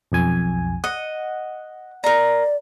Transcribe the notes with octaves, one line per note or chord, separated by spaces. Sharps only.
B1 F2 G#5
D#5 F#5
A#4 D5 A#5